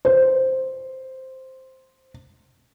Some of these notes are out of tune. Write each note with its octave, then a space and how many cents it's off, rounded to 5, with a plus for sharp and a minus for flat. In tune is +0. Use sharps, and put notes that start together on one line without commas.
C5 +0